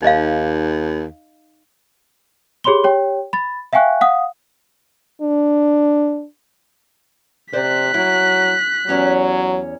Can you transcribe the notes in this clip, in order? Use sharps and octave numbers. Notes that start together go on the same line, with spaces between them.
D#2 D#4 D#5 F5
G4 G#4 C#5 B5 C6 G7
G4 C#5 G5
B5 A6
E5 F5 G5 G#5 C#6 F#6
F5 F#5 D#6
D4
C3 C5 D5 F#6 B6
F#3 E4
E2 F#3 C#4 G4